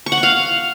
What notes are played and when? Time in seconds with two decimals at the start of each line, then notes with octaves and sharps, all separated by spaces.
0.06 C#6
0.12 F#5
0.17 C#6
0.23 F5